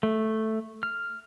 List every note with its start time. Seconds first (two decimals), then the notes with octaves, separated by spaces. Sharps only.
0.03 A3
0.83 F6